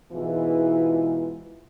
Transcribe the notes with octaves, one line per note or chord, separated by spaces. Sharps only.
G#2 B2 E3 G#3 E4 F4